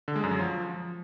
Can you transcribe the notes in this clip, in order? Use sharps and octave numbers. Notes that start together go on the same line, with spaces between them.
D3
G#3
F#2
F#3
F3